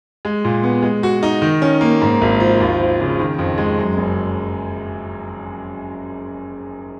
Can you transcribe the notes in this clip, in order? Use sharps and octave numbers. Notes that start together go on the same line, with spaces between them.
G#3
A#2
B3
G#3
F#4
D#4
D#3
C#4
A#3
G#2
G#1
F3
D#2
F3
C#3
D#3
F2
G#3
F#2
F#1